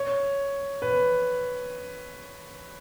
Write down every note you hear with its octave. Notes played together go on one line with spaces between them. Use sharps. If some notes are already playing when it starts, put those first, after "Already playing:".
Already playing: C#5
B4